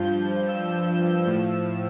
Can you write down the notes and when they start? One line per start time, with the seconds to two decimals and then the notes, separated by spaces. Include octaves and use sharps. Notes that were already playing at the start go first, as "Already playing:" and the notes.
Already playing: G2 F3 G6
0.48 E6
1.26 A2 F3